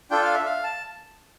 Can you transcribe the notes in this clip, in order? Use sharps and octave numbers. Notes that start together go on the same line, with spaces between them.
D4 F4 A4 G5
F5
E5
F5
A5